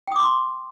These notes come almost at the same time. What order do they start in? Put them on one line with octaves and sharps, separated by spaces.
G5 D#6 D6 C6